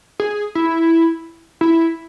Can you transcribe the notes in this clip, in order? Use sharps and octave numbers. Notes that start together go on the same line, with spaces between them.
G#4
E4
E4